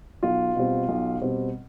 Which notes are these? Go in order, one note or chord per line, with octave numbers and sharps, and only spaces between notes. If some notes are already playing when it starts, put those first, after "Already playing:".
B1 F4
B2 G3 C4
B1
B2 G3 C4